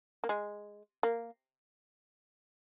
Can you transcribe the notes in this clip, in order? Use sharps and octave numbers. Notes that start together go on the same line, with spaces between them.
A#3
G#3
A#3